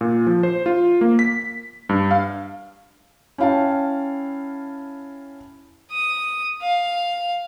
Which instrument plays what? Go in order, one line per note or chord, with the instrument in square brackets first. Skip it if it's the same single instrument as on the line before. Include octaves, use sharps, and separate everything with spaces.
[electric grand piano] A#2
F3
C5
F4
A#3
B6
G2
F5
[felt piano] C#4 E4 F5 G5 A5
[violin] D#6
F5